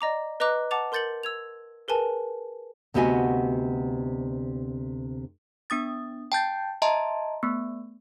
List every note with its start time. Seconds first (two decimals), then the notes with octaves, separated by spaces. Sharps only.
0.01 D5 D#5 A#5 D6
0.40 B4 D#5 A#5 D6 F#6
0.71 F#5 A5 D6 A6 F7
0.92 A#4 C6 G6 A6 C#7 F#7
1.23 E6 G#6 F7
1.88 G#4 A#4 B4 G#5 A5
2.94 D2 C3 B3 F#4 D#5 G#5
5.70 B3 D4 D#6 A6
6.32 G5 A5 G6 A6
6.82 D#5 E5 A5 A#5 C6
7.43 A3 B3